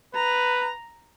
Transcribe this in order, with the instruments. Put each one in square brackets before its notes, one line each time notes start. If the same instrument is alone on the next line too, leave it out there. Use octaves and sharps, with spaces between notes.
[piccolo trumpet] B4 [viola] A#5